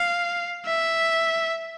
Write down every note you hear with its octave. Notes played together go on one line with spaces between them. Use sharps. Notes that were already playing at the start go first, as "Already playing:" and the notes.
Already playing: F5
E5